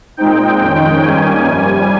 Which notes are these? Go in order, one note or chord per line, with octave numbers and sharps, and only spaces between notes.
A#2 G#3 C4 D#4 G5
F2 D#3 G#3 C#4
G2 D#3 A#3 C#4 G#5
F2 C3 G3 G#5